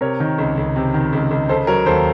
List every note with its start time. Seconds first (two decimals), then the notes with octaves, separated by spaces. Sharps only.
0.01 C3 A#4 C#5
0.20 D#3
0.38 C#2
0.57 C#2
0.76 C3
0.94 D#3
1.13 C#2
1.31 C#2
1.49 C#3 A4 C5
1.67 F#3 A#4 C#5
1.86 D#2 A4 C5